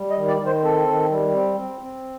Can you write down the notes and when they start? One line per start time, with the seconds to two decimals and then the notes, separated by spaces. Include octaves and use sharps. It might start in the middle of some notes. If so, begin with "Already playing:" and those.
Already playing: G3
0.10 D#5
0.16 D#3
0.28 D5
0.40 D#3
0.46 C5
0.63 C4 A4
0.88 D#3
1.11 G3
1.34 C4
1.58 C4
1.81 C4